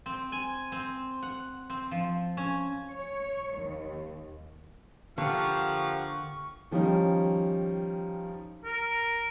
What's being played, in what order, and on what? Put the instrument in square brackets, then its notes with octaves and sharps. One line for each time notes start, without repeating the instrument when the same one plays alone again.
[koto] C4
G#5
C4
F#5
C4
F3
C#4
[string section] C#5
D#2
[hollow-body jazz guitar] D3 [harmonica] F3 F5 [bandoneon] A#3 G4 F#5 [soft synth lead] C#6
[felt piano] D#3 F3 G3 C#4 D#4
[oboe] A#4